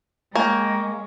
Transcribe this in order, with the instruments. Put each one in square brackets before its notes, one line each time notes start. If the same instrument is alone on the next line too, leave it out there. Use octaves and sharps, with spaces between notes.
[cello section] G#3 [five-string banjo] A#3 [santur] C#4 [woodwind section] G5 A#5